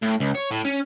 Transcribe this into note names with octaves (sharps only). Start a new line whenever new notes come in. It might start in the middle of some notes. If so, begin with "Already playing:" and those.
A2
C#2
C#5
A2
C#4